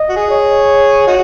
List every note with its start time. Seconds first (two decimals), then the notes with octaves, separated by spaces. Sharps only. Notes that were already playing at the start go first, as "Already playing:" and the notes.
Already playing: D#5
0.09 F#4
0.16 G#4
0.30 C#5
1.07 D#4 F#4